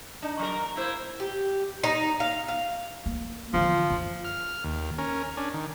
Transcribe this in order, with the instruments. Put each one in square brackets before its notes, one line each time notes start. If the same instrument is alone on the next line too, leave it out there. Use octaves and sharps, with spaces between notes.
[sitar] D4 D#4
F#3 A#4
A#3 E4 C5
[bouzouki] G4
D#4
F5
F5
[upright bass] A#3
[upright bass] D3 E3 [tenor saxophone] F3
[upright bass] F#2
[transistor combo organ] F6
D#2
C#4 A#4
C#4 D4
D#3